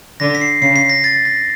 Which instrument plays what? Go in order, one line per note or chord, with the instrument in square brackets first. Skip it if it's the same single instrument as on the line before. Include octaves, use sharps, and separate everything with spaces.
[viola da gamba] D3 [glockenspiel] A#6
[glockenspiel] B6
C7
[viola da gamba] C#3 [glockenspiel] C7
[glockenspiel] B6
A#6
A6
A#6